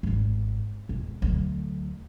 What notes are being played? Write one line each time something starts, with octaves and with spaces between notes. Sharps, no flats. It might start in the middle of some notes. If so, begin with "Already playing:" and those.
G#1 G#2
E1
D2 F#3